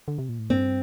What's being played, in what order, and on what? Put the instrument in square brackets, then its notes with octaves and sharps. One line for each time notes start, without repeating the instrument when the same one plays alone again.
[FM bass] D3
C3
A#2
A2
[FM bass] G2 [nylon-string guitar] C4